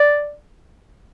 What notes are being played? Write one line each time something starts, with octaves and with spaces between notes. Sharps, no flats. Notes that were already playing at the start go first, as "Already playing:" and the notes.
Already playing: D5